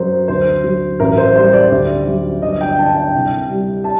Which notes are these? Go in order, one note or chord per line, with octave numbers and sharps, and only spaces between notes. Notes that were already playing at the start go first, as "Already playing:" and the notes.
Already playing: F#2 F#3 A#4 C5
D2 C5
F#3
A1 A#4
C5
G3 C5
D5
D2
F#3
G1 D#5
G5
D3 A5
G5
C2
G3
A5